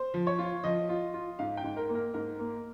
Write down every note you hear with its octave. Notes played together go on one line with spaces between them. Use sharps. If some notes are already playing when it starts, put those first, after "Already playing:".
Already playing: C5
F3
C#5
F4
F3 D#5
F4
F4
G#2 F5
G5
G#2
A#4
A#3
A#4
G#2 A#4
A#3